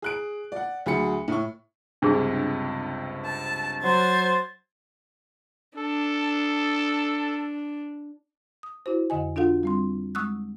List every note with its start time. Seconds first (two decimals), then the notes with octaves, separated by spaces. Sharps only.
0.02 G#4 F#6 D7
0.52 D5 F#5
0.86 D2 F#3 G#4 B5 C#7
1.28 A2 C#6
2.02 C#2 G2 C3 D4 G#4
3.26 A5
3.83 F#3 C5 G#6 A6
5.78 D4 A4
8.63 D#6
8.86 E4 F#4 C5
9.10 F2 D3 D#5 G#5
9.36 D4 F4 F#4 A4 F5 F#5
9.63 G3 C4 C6
10.15 G#3 C#6 D#6 E6 F#6